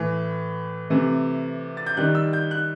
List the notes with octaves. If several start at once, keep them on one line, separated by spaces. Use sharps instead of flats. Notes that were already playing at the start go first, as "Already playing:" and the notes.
Already playing: A2 E3 A3
C3 E3 A3
A6
G6
D#3 G3 F#6
E6
G6
F#6